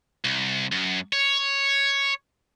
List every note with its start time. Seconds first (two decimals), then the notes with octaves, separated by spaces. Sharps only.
0.25 C2
0.72 F#2
1.13 C#5